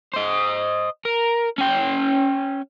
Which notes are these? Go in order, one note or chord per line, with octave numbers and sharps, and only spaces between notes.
C5 D#5
A#4
C#4 G5